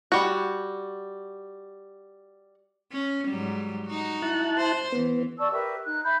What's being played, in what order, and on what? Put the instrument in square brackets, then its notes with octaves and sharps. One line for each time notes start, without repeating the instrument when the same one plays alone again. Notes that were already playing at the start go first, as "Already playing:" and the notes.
[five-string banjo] G3 F#4
[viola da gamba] C#4
G#2 F#3 G3
D#4 F#4
[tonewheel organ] E4 A5 F#6
[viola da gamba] C5
[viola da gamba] E3 [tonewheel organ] B3
[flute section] D5 A5 C#6 E6
G4 A#4 B4 E5
D#4 F#6
E5 B5 G6